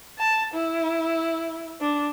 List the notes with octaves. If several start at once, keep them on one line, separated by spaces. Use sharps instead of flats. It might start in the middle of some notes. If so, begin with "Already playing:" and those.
A5
E4
D4